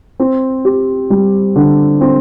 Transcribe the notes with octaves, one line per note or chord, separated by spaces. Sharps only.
C4
G4
G3
D3
C4